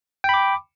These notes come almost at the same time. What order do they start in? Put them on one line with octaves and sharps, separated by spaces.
G5 B5 D6